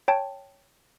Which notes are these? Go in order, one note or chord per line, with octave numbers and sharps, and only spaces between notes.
C#5 G5 A5